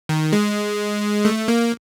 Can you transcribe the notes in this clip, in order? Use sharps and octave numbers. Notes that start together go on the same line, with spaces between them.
D#3
G#3
A3
A#3